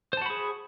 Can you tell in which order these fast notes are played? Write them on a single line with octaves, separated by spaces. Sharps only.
C5 A5 F#4 B5 G#4